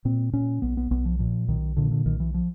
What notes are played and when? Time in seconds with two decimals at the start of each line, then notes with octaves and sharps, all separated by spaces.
0.05 A#2 C4
0.33 A#2 C#4
0.62 B1 B3
0.77 B3
0.91 B1 B3
1.05 F3
1.19 A#2 F3
1.48 B1 D#3
1.76 A#2 D3
1.91 D3
2.06 B1 D#3
2.20 E3
2.34 F3